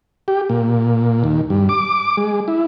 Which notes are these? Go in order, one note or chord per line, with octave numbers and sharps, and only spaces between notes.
G4
A#2
D#2
G2
D6
G#3
E4